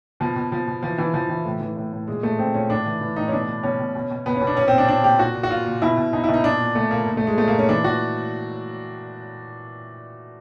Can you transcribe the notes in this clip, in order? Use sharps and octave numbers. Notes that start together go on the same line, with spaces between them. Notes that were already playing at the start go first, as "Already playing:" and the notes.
B2 F3
B2
B2 F3
B2
E3 F3
E3
E3 F3
E3
A2
E3
A2
A2
A#2 G#3
A#2 A3
A#2 C4
A#2 C#4
A2 D4
E3
E3
A2 D#4
C#4
B2 D4
B2
B2 C#4
B2
B2
B2
B2 B3
C#4
B2
D4
A#2 C#4
C4
A#2
D4
A#2 D4
A#2 G4
A#2 F#4
A#2
F#4
A#2 F4
A#2
B2 E4
B2
B2 D#4
E4
B2
D#4
A#2 D4
A#2
A#2 A3
A#2 A#3
A#2
A3
A#2
G#3
A#2 A3
A#3
A#2
C#4
E3 D4
E3 F#4